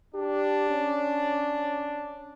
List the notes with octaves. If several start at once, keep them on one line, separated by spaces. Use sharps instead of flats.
D4 G4
C#4